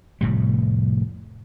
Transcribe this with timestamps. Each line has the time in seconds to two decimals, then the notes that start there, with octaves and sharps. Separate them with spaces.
0.21 F1 A2 G3